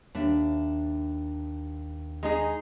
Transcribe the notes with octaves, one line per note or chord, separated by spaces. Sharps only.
D#2 D4 E5
G#3 D#4 G#4